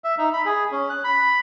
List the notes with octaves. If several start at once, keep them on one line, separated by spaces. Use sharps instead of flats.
E5
D#4
B5
G#4
C#4
F#6
B5